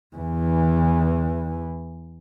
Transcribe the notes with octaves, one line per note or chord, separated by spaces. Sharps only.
E2 E3